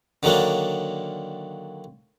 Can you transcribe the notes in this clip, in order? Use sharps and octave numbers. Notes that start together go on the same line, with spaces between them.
D3 D#3 F#3 A#3 D4